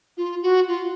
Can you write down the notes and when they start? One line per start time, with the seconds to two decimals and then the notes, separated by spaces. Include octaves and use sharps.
0.17 F4
0.43 F#4
0.68 F4